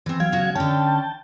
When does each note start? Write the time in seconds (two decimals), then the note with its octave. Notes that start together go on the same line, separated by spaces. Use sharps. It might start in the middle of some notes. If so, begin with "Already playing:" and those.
0.06 E3 C4
0.20 F#3 F5 G5 G#6
0.32 C#3 F#4
0.55 D3 C#4 G5 A5